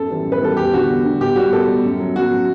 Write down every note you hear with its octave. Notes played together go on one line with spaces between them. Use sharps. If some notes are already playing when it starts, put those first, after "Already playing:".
Already playing: F#2 A4
E3 G3
F#2
B4
E3 G3 A4
E2 G4
D3 G3 F#4
E2
D3 G3
B2 G4
G3 F#4
B2 A4
G3
F#2
F#3
F#2 F#4
F#3